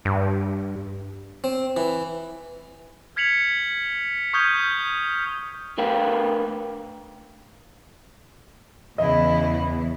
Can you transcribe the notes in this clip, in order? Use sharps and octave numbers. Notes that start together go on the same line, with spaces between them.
G2
C4
E3
F6 G#6 B6 C#7 F7 F#7
C#6 D#6 F6 G6 G#6 G7
D3 A3 A#4 B4 F5 G5
E2 C#3 E4 D#5